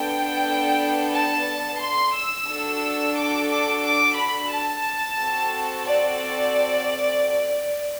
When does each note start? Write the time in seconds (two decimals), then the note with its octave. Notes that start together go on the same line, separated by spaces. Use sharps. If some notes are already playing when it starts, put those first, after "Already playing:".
Already playing: B3 D4 A4 G5
1.13 A5
1.80 C6
2.14 E6
2.47 D4 F#4 A4
3.16 D6
3.48 D6
3.82 D6
4.16 B5
4.50 A5
5.18 C4 F#4 A4
5.85 D5